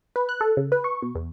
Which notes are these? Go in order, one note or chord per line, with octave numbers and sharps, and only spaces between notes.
B4
F#6
A4
C#3
B4
C#6
B2
E2